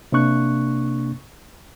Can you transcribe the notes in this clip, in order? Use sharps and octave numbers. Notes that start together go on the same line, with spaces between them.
C3 A#3 D4 C#6 F#6